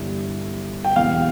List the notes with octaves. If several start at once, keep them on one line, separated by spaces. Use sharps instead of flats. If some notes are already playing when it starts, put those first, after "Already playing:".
Already playing: G1 G2 E3
G5
E1 E2 C3 E3 F5